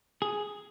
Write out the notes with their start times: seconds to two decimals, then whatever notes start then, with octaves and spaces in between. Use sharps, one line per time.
0.22 G#4